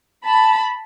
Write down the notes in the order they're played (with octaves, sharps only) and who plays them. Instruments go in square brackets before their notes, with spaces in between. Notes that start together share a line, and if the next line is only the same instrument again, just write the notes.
[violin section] A5 B5